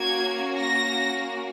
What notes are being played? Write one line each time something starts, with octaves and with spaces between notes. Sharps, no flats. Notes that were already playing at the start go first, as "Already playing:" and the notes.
Already playing: A#3 C#4 F#4 G#6
A#6